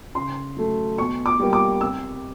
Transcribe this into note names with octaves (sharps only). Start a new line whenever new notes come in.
C#3 C6
F#3 A3
B2 C#6
D6
G3 A#3
D6
C3 E6